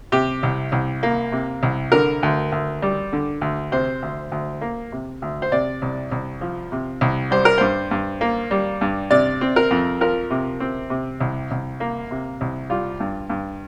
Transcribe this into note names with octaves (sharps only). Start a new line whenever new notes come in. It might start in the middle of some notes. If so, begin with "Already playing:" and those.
C3 G4
C2
C2
A#3
C3
C2
D3 A#4
D2
D2
G3
D3
D2
C3 C5
D2
D2
A#3
C3
D2
C5
C3 D5
C2
C2
F3
C3
C2
G3 C5
A#4
G2 C5
G2
A#3
G3
G2
C3 D5
C4
A#4
F2
F3 A#4
C3
C4
C3
C2
C2
A#3
C3
C2
G3 F4
G2
G2